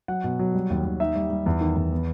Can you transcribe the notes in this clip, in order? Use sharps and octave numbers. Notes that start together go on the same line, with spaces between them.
F#3 F#5
B2
F#3
G3
D#2
D#2
D#4 E5
G3
G3
E2
D#3
E2
B3